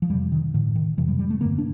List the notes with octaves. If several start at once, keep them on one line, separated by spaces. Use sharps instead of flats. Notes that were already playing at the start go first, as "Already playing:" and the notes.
F3
F2 C3 G3
D#3
A2 D3
D#3
F2 C3 F3
G3
G3
A3
G2 D3 A#3
D4